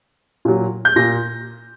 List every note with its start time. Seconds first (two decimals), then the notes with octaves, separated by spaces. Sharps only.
0.45 A#2 F#3
0.85 G6
0.96 A#2 A#6